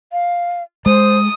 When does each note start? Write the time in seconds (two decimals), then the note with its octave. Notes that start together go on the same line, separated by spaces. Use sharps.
0.12 F5
0.86 G#3 C5 D#6